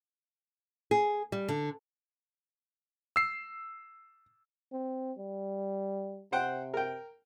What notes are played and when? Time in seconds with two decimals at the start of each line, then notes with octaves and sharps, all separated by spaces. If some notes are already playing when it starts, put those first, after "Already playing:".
0.91 G#4
1.32 G3
1.48 D3
3.16 E6 C7
4.72 C4
5.18 G3
6.32 C3 C5 F#5 G5
6.74 A#4 G5